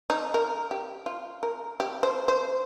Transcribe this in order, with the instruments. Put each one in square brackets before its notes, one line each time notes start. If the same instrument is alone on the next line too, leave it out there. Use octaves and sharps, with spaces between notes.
[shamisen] D#4
A#4
G4
F4
A#4
G4
C5
C5